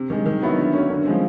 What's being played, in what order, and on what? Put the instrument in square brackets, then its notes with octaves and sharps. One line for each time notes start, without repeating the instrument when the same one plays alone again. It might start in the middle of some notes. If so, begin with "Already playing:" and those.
Already playing: [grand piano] C3
D#3 G#3
D#3
F#3 B3 E4
D3
F#3 A#3 C#4
D3
F3 G#3 C4